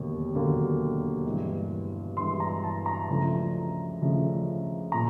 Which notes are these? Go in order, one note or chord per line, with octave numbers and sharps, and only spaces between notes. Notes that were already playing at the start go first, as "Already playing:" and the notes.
Already playing: E1 D#2 D3 F#3 A#3
E1 D#2 D3 F#3 A#3
G2 E3 G#3
G2 E3 G#3 C6
A#5
A5
A#5
C#2 C#3 F3 A3 D4
C#2 C#3 F3 A3 D4
A#2 A#5